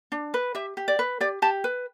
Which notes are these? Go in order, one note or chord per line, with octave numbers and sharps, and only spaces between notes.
D4
B4
G4 E5
G4
D5
B4
G4 D5
G4 A5
B4